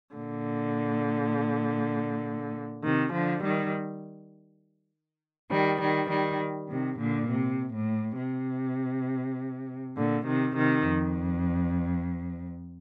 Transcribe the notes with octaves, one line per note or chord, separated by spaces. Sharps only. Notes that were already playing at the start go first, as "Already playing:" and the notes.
A#2 D3
C3 D#3
D3 F3
D#3 G3
D#3 G3
D#3 G3
D#3 G3
C3 D#3
A#2 D3
C3
A2
C3
A#2 D3
C3 D#3
C3 D#3
F2